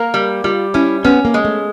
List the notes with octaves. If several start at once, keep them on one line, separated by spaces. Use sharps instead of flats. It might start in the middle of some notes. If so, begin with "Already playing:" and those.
Already playing: A#3 A#4
G3
G3 F4
C#4 E4
B3 C#4
A#3
G#3
A3